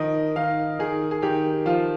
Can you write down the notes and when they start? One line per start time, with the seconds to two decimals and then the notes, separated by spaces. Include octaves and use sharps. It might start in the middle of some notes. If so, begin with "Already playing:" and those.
Already playing: D#3 F3 D#5
0.36 D#3 F5
0.79 D#3 G#4
1.11 G#4
1.22 D#3 G4
1.66 F3 F4